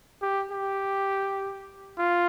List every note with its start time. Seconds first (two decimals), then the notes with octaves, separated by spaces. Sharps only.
0.22 G4
0.51 G4
1.99 F4